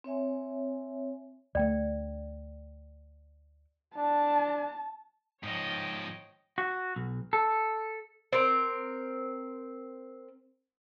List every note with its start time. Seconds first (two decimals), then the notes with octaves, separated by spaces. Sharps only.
0.04 C4 C#5 E5 G#5
1.55 D2 A3 D5 G5
3.96 D4 A5
5.43 G#2 F3 C#5 D#5 G5
6.58 F#4
6.96 B1
7.33 A4
8.33 C4 A#4